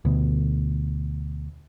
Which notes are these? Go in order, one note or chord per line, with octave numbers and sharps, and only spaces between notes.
D2 B2